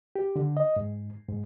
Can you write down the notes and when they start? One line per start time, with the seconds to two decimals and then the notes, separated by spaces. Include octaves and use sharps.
0.16 G4
0.36 D3
0.57 D#5
0.76 G#2
1.28 G#2